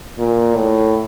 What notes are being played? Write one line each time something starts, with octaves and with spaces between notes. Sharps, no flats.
A#2
A2